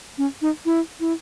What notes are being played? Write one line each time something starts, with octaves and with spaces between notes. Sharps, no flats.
C#4
D#4
E4
E4